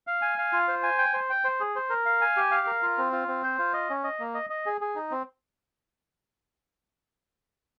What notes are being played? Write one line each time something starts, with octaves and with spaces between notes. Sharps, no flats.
F5
G#5
F5
F4
C5
G#5
G5
C5
G5
C5
G#4
C5
A#4
F5
G#5
G4
F5
A#4
F4
C4
F4
C4
C5
F4
D#5
C#4
D#5
A#3
D#5
D#5
G#4
G#4
D#4
C4